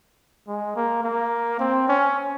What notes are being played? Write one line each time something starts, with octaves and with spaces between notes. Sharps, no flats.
G#3
A#3
A#3
C4
C#4